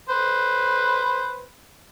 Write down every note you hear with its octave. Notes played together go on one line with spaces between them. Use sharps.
B4 C5